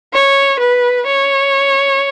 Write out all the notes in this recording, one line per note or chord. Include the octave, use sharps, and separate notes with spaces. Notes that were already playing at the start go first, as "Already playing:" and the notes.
C#5
B4
C#5